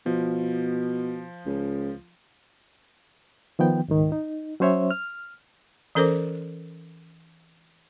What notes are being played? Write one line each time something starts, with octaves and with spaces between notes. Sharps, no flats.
B2 F3
C#2
D#3 F3 B3 G5
C#2 G#2 D#3
D#4
F#3 C#4 C5 C#5 E5
F6
E3 C#4 A4 A#4 C5 D6